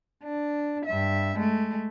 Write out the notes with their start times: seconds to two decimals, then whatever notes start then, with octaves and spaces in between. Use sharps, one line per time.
0.24 D4
0.85 G2 E5
1.38 G#3 A3